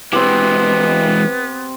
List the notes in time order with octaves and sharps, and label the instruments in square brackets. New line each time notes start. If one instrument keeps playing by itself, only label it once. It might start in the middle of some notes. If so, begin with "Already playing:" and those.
[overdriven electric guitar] E3 G#3 [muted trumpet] B3 [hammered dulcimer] C4 G4 [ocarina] B4